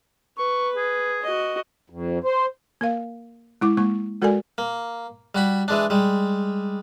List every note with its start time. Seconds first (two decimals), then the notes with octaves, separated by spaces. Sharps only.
0.38 B4 C#6
0.76 G#4
1.22 F#4 D#5
1.90 F2
2.24 C5
2.81 A#3 A#4 F5
3.61 G#3 E4 D6
3.77 G#3 A#3 C#6
4.22 G#3 F#4 A4 A#4 D5 G#5
4.58 A#3
5.35 G3 F#4 B5
5.68 E3 G#3 D4
5.90 G3 G#3